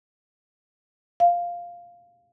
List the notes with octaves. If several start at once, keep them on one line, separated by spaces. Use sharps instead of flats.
F5